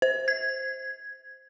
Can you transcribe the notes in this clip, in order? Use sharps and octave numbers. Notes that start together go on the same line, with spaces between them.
C5
G#6